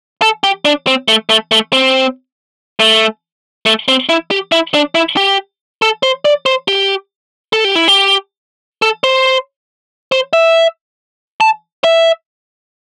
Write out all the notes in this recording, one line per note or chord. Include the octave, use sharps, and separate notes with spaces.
A4
G4
D4
C4
A3
A3
A3
C4
A3
A3
C4
E4
G4
E4
D4
E4
G4
A4
C5
D5
C5
G4
A4
G4
E4
G4
A4
C5
C5
E5
A5
E5